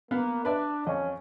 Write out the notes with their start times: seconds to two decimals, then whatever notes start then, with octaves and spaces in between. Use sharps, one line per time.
0.11 A#3 B3 B4 F5
0.45 D4 B4 D5 E5
0.87 F2 C#4 D#5